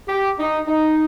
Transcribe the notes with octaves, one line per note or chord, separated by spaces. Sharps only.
G4
D#4
D#4